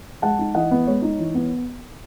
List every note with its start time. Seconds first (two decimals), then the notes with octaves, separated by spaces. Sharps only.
0.22 G#3 F#5 A5
0.39 D#4
0.55 E3 D#5 F#5
0.71 B3
0.87 G#3 C#5
1.02 D#4
1.19 E3
1.34 B3